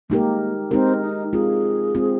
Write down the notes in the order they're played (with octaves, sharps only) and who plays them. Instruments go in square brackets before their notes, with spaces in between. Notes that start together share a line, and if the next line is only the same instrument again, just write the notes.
[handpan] G#3 D#4 G4 A#4 [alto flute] A#3
[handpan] G#3 D#4 G4 A#4 [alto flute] C4
[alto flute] D#4
[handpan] G#3 C4 F4 [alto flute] G#4
[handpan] G#3 C4 F4